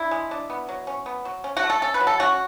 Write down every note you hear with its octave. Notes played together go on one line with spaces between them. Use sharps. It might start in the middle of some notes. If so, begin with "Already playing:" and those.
Already playing: D4 E4
G#3
D4
B3
F#3
C#4
B3
F#3
C#4
F#4
A3
A4
C#4 A4
B4
F#3
A4
C#4 F#4